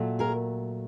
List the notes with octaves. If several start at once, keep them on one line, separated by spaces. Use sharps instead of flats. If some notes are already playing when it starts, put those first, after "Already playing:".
Already playing: A#2 F#3 A3
G#4 A#4